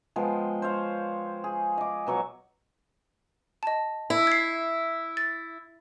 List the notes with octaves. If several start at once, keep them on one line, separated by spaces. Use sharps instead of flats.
F3 G#3 B3 G5
C5 C#5 F5
G#4
D#5 D6
B2 F#3 C#6
D#5 A5
E4
G#6 C7
A6